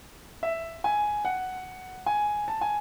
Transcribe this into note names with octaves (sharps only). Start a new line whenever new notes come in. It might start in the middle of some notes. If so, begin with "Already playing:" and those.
E5
G#5
F#5
G#5
A5
G#5